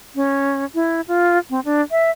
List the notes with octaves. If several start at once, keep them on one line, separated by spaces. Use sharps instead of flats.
C#4
E4
F4
C4
D4
E5